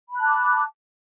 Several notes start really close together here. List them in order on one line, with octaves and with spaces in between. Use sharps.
B5 F#6 A5 D6